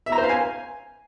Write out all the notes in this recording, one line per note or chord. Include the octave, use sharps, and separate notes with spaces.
E5
A#5
C5
F5
G#5